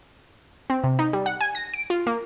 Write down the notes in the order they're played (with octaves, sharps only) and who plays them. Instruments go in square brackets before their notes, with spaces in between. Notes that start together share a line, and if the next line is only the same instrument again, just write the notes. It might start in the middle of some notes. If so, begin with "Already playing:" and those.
[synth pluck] C4
C3
D#4
G3
F#5
G#5
A#6
D7
F4
A#3